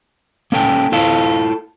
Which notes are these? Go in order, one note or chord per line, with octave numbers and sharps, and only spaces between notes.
A#3 C#4 A4 G5
E4 F4 A4 F5